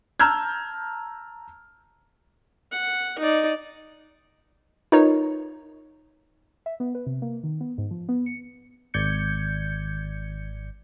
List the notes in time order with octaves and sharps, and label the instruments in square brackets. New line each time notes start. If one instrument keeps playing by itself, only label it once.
[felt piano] A5 A#5 E6 F6 G6 G#6
[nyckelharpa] F#5
D#4 D5
[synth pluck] D#4 F4 A#4 B4 C#5
[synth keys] E5
B3
B4
C3
A#3
D#3
B3
G#2
F3
B3
C#7
G#1 D5 G6 G#6 C#7